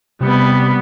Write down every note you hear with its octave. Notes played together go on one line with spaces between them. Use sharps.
C3 G3 B3